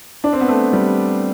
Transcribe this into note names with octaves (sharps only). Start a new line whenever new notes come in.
D4
C4
B3
A3
G3